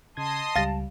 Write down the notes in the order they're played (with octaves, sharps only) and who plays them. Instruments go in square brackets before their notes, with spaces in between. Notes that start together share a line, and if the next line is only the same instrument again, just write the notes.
[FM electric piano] C#3 G#6 [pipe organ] D#5 C6 D#6 [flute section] A5
[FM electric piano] C#2 G3 [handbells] F5 A6 A#6